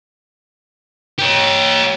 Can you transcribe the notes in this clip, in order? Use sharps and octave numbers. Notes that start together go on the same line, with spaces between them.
G4 C#5